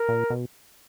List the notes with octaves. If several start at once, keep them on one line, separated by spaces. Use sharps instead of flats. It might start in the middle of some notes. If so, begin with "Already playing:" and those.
Already playing: A#4
A#2
B2